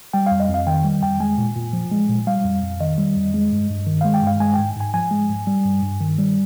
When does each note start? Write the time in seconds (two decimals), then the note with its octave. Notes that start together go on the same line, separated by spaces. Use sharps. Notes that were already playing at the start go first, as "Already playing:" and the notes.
0.13 G3 G5
0.27 F5
0.32 F2
0.40 D#5
0.49 F2
0.54 F5
0.67 D#3 G5
0.84 G3
1.03 F2 G5
1.20 G#3 G#5
1.38 A#2
1.56 A#2
1.73 F3
1.91 G#3
2.09 A#2
2.27 G3 F5
2.45 F2
2.62 F2
2.80 D#3 D#5
2.98 G3
3.16 F2
3.34 G#3
3.52 G2
3.70 G2
3.87 D#3
4.01 G#3 F5
4.14 G5
4.22 G2 F5
4.40 G#3 G#5
4.54 G#2 G5
4.76 G#2 G#5
4.94 F3 G#5
5.11 G#3
5.29 G#2
5.47 G3
5.65 G2
5.83 G2
6.01 D#3
6.18 G3